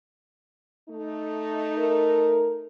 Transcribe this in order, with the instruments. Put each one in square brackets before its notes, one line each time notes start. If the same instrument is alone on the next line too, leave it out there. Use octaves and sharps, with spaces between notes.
[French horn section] A3 D#4
[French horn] A#4